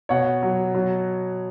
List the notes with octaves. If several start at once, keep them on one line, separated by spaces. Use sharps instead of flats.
B2 C#5 F#5
F#3
F#3